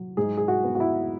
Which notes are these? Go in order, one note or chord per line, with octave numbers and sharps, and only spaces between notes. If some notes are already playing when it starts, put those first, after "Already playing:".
Already playing: F#3
G#2 G#4
G#4
F#4
B3
F#4
E4